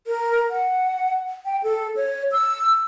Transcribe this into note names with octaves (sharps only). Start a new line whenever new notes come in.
A#4
F#5
G5
A4
C#5
E6